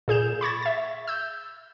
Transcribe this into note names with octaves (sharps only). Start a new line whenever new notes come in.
A#2 G#4 G6 E7
B5 C#6 G#6 A6
E5 A6
E6 G6